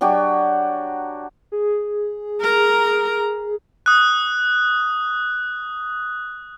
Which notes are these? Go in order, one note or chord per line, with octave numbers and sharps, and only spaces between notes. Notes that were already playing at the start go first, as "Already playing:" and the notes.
F#3 D4 F#4 G4
G#4
A#4 A#5
D#6 F#6